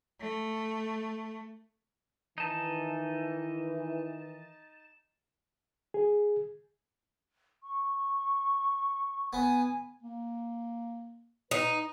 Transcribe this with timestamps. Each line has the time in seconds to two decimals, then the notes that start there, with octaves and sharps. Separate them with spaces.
0.20 A3
2.38 D#3 E3 D#4 A5
5.94 G#4
7.62 C#6
9.33 B3 G#5
10.03 A#3
11.51 D#4 B4